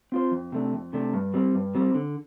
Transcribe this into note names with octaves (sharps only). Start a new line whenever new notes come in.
C4 F4 C5
F2
C3 A3 D4
F2
C3 A3 D4
G2
G3 C4
G2
G3 C4
D3